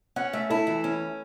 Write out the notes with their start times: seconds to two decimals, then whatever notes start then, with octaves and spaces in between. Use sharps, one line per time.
0.16 C#4 F#5
0.33 A3 E5
0.50 E4 A4
0.67 E3
0.84 C#4